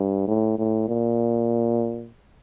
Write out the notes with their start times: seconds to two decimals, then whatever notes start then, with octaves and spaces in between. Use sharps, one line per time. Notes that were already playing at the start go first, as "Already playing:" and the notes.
Already playing: G2
0.28 A2
0.59 A2
0.88 A#2